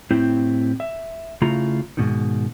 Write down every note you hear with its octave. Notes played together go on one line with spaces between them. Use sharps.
A2 C4 E4 G4
E5
C#3 A3 E4 F4 A#5
G#2 B2 D#3